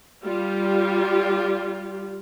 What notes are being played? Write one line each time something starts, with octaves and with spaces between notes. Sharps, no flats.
G3 F4 G4